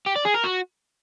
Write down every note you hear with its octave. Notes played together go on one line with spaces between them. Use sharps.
G4
D5
G#4
A#4
F#4